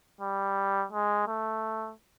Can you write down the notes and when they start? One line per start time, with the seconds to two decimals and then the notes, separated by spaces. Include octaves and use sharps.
0.21 G3
0.92 G#3
1.28 A3